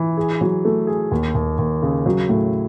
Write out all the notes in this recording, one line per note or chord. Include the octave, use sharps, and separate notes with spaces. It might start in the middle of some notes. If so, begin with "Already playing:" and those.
Already playing: E3
G#4
F#3
A3
G#4
D#2
D#2
D#2
C#3
F#3
A2